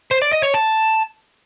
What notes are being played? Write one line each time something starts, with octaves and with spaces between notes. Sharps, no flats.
C5
D5
D#5
C#5
A5